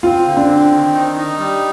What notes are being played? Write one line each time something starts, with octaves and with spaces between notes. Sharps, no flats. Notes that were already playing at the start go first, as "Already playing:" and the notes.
C4 F4
D3
D4
C4
D#3
D#4
D#4
G3